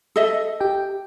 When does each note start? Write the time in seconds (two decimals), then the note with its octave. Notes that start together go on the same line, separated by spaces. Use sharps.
0.16 A4 D#5 E5
0.60 G4 G5